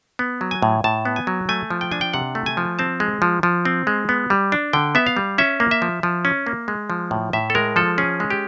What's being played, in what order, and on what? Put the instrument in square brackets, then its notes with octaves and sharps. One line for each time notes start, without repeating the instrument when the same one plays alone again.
[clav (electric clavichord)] B3
F#3
G#5
A2
A2 A5
B3
G#5
F#3
A3 G#5
F3
G5
D4 G#5
G5
C3 F#5
A3
G#5
F3
C4 A5
G#3
F3
F3
C4
G#3
B3
G3
D4
D3 G5
B3 E5
F5
G3
C#4 E5
A#3
E5
F3
F3
C#4
A#3
G#3
F3
A2
A2 E5
A4
G#3 A#4
F3 A4
C#4 G#4
G#3
G4